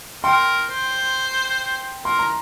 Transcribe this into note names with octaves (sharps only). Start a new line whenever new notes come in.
A#4 G5 C6
C5
A#4 C6
A#5